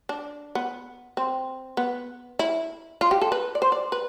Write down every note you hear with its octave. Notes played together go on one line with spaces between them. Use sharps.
D4
B3
C4
B3
E4
F4
G4
A4
B4
D5
C5
D5
B4